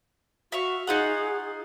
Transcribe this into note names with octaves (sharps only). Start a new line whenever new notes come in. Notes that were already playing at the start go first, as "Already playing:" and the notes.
F#4 E5 F5 C#6
D#4 F4 G#4 F#5